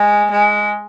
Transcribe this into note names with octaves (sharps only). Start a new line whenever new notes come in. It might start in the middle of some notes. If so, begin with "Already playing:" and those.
Already playing: G#3
G#3